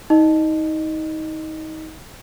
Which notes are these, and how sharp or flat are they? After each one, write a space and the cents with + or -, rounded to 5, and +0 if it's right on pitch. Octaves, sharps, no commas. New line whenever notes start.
D#4 +25 D#5 -20